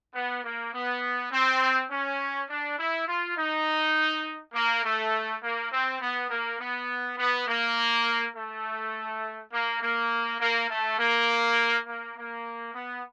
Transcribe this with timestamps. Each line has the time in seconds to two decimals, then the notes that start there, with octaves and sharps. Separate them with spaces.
0.15 B3
0.44 A#3
0.73 B3
1.32 C4
1.91 C#4
2.49 D4
2.78 E4
3.07 F4
3.37 D#4
4.54 A#3
4.84 A3
5.43 A#3
5.71 C4
6.01 B3
6.30 A#3
6.59 B3
7.18 B3
7.47 A#3
8.36 A3
9.53 A#3
9.82 A#3
10.40 A#3
10.69 A3
10.99 A#3
11.87 A#3
12.17 A#3
12.74 B3